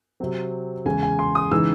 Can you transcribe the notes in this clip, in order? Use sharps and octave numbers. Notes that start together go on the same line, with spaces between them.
C3 F#3 C4
E2 C#3 G#3 G#5
G#5
C6
D#6
C#3 E3 G#3 D#4 E6